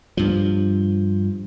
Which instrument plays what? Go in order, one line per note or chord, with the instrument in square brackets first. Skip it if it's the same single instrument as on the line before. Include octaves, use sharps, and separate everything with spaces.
[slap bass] G2 F3